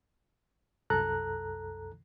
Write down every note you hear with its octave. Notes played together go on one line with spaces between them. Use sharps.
C2 F#2 A4 A#5 F#6